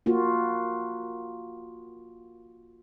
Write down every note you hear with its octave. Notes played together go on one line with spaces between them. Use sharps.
A#3 F4 F#4